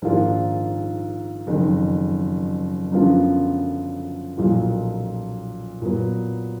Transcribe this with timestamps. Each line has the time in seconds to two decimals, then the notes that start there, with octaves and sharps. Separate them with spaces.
0.02 A#1 G#2 D#3 A#3 F4
1.47 F#1 F2 D#3
2.92 F#2 D3 F3 B3 F4
4.38 B1 A#2 F3 A#3 F4
5.82 A#2 F#3 B3